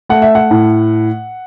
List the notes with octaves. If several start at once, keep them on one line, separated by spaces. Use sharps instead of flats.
A3 F#5
E5
F#5
A2